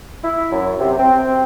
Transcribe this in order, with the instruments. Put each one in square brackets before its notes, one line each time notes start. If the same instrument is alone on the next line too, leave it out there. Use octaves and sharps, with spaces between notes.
[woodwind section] E4
F#2
C3
C4